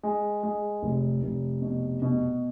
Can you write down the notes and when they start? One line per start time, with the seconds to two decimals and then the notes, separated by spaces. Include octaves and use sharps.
0.03 G#3
0.43 G#3
0.82 F1
1.23 F1
1.62 B2
2.02 B2